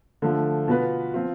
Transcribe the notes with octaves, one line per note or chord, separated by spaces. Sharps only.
D3 F3 A3
B2 B3 F4 B4
F3 C4 F4